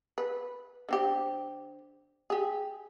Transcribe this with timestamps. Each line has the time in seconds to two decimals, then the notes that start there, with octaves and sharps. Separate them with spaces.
0.18 B4
0.89 D3 C4 G4
2.30 G4 G#4